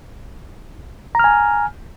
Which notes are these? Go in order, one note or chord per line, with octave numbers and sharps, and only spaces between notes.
G#5 A#5 F6